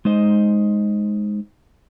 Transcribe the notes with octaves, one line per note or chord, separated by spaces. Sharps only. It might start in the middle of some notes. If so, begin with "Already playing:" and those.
G#3 D#4 C5 D#5